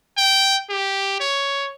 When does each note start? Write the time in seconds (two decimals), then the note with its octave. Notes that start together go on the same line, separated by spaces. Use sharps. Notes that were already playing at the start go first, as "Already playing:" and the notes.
0.17 G5
0.70 G4
1.20 C#5